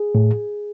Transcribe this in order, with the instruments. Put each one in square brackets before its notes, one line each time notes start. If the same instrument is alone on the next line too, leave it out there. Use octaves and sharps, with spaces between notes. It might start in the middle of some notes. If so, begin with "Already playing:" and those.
Already playing: [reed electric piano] G#4
A2